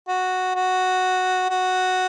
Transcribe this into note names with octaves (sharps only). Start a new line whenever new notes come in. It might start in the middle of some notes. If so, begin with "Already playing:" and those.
F#4
F#4
F#4